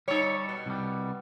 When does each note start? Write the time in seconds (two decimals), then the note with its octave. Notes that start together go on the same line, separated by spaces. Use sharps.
0.08 G3 D#4 A4 C#5
0.49 B2
0.66 C2 G3